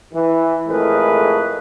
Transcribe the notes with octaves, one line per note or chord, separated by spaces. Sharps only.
E3
F2 A2 G#3 G#4 A#4 B4